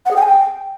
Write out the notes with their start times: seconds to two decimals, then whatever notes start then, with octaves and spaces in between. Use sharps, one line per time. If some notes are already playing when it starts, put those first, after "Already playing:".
0.06 F#5
0.11 G#4
0.16 G5
0.21 G#5
0.26 G5